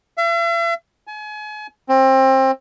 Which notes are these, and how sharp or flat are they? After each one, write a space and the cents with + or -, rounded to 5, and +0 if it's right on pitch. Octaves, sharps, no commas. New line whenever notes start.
E5 +45
G#5 +35
C4 +25